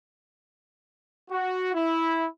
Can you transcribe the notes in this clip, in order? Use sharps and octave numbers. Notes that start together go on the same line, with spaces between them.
F#4
E4